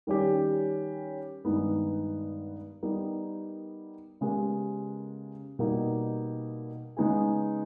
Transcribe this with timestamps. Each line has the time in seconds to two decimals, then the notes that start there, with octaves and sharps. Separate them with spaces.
0.07 D#3 G3 C#4 G4
1.45 G2 D#3 G#3 B3 D#4
2.83 G3 B3 D#4 A#4
4.21 C#3 G#3 B3 G4 A#4
5.59 B2 G3 A#3 D#4
6.97 C#3 G#3 B3 D#4 G#4